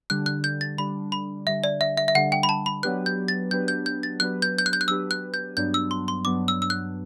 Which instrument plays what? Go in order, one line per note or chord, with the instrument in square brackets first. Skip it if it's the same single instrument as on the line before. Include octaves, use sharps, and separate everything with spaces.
[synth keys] D3 G3 D4 [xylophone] F#6
[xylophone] F#6
G6
A6
[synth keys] D3 G3 D4 [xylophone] B5
[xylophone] B5
[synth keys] D3 G3 D4 [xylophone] E5
[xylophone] D5
E5
E5
E5
[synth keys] D3 G3 D4 [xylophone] F#5
[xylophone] G5
B5
A5
B5
[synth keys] F#3 B3 D4 G4 B4 [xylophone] F#6
[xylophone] G6
A6
[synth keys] F#3 B3 D4 G4 B4 [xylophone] G6
[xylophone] G6
G6
A6
[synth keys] F#3 B3 D4 G4 B4 [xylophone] F#6
[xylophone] G6
G6
F#6
G6
F#6
[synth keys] F#3 B3 D4 G4 B4 [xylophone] E6
[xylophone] F#6
G6
[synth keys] G2 F#3 B3 D4 [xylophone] G6
[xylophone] E6
C6
C6
[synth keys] G2 F#3 B3 D4 [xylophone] D6
[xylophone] E6
E6
F#6